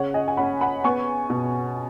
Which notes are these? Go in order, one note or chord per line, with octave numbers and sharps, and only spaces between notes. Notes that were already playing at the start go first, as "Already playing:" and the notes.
Already playing: C#3 C#5 F#5
D#5 G#5
G#5
C#4 F#5 B5
F#5 B5
B3 G#5 C#6
B2